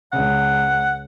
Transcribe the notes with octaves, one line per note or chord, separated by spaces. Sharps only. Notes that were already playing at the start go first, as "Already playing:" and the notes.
C#2 F#5